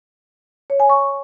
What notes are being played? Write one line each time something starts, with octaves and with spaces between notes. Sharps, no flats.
C#5
G#5
C#6